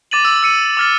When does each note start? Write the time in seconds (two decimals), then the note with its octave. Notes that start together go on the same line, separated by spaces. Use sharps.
0.11 D6 A6 D#7 F#7
0.25 E6
0.43 E6 C#7 D#7
0.77 D6 F6 A6